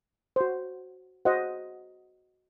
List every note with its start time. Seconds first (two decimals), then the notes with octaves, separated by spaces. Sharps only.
0.36 F#4 C5
1.25 F#4 C5 D#5 F#5